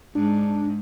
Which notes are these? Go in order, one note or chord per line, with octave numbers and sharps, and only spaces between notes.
G#2 D4